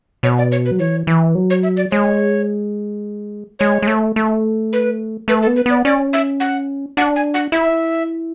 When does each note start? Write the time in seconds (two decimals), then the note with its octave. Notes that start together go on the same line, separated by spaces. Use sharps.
0.23 B2 C#5
0.38 D5
0.52 C#5
0.66 B4
0.71 F#3
0.79 E3 C#5
1.07 E3
1.35 F#3
1.50 C#5
1.63 E5
1.77 D5
1.91 G#3 C#5
3.59 G#3 C#5
3.82 G#3
3.87 A3
4.16 A3
4.73 B4
5.28 A3 B4
5.43 A4
5.47 B3
5.56 B4
5.66 B3 D5
5.85 C#4 D5
6.13 E5
6.40 F#5
6.97 D4 F#5
7.16 G#5
7.34 F#5
7.52 E4 E5